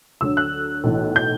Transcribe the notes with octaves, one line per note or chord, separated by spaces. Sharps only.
D2 D3 F#3 E6
F#6
B1 A2 E3
G6